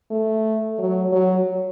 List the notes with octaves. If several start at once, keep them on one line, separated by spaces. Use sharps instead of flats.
A3
F#3
F#3